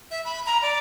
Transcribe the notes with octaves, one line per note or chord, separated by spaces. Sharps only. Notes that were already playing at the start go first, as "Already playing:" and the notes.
E5
B5
A#5
D5